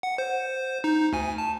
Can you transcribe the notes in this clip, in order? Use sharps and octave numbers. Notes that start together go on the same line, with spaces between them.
F#5
C5
D#4
D2 G#5
A5